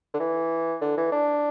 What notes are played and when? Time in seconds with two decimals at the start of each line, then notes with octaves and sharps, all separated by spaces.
0.14 D3
0.20 E3
0.81 D3
0.97 E3
1.12 D4